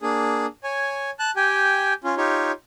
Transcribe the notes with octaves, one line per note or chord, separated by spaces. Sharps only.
A#3 D4 G#4
C#5 G#5
A5 F#6
G4 G5 G#5
C#4 F4
D#4 F4 G4 C#5